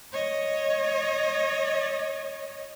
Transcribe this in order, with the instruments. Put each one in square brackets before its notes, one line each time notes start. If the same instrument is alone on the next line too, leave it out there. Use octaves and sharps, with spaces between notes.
[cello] C#5 D#5